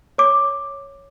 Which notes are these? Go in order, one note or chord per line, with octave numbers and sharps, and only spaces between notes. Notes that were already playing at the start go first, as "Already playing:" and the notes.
C#5 D6